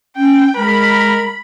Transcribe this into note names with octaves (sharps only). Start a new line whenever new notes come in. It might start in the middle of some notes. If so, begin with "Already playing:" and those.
C#4 G5
G#3 A#4 B5